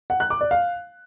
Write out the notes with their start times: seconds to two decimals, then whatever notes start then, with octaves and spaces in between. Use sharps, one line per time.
0.10 F#5
0.20 F#6
0.30 D6
0.41 D5
0.51 F5